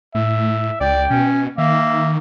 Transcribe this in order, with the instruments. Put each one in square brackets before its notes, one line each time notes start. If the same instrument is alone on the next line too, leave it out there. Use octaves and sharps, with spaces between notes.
[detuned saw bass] A2 [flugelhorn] E5
[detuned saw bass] C#2 [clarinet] D5 [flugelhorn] G5
[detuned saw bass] B2 [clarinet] C#4
[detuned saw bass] D#3 [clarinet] A#3 [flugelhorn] E5